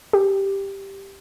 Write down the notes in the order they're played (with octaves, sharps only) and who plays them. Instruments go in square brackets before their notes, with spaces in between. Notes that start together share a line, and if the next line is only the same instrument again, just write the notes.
[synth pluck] G4